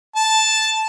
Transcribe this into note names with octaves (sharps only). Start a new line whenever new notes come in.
A5